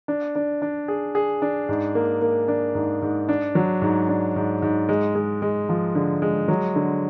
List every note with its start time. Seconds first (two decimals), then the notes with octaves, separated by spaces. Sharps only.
0.08 D4
0.35 D4
0.62 D4
0.88 G#4
1.15 G#4
1.42 D4
1.69 G#2
1.95 A#3
2.22 A#3
2.48 D4
2.75 G#2
3.02 G#2
3.29 D4
3.55 F#3
3.82 G#2
4.09 D4
4.36 G#2
4.62 G#2
4.89 G#3
5.15 G#3
5.42 G#3
5.69 F3
5.95 D3
6.22 G#3
6.48 F#3
6.76 D3